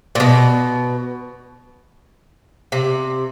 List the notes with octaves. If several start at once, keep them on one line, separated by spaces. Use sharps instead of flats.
A#2
B2
C3